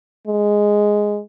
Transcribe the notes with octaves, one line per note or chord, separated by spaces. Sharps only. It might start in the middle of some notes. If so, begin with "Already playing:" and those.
G#3